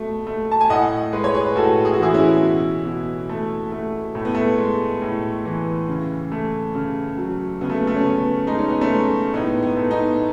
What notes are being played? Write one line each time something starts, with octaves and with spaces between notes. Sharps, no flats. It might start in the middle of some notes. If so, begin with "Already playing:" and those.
Already playing: B2 A3
A3
A5
G#5
A2 D#5 F#5
G#3 B4
C#5
G#4 B4
A2 F#4 A4
G#4
F#4
E3 E4 G#4
C#4 E4
B2
B2
A3
A3
A2 A3
B3
A3
G#3
A2
E3
C#3
A3
C#3
F#3
C#3 B3
A3
A3
C#4
C#3 B3
G#3 D#4
C#4
B3
A3 C#4
G#3
A2 B3 D#4
B3
A3
B3 D#4